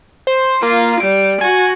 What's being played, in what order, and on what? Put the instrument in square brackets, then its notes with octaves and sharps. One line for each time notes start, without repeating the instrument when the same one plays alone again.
[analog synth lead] C5
[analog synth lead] A#3 [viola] F4
[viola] G3 [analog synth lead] D7
[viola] F#4 [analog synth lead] G#5